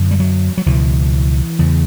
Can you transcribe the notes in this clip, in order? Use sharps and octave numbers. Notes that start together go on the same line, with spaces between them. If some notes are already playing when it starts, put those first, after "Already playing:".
Already playing: F#2 D3
G3
F#3
F#3
C#2 B2 E3
E2 C#3